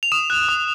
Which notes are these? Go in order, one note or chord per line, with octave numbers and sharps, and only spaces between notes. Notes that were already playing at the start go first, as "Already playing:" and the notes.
F7
D#6 E7
F#6
D#6